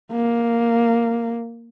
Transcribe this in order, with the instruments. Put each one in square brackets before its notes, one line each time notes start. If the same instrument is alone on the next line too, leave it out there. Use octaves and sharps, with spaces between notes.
[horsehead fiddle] A#3